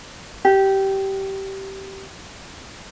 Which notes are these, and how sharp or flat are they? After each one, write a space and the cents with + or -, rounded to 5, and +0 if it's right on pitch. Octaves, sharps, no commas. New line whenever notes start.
G4 -15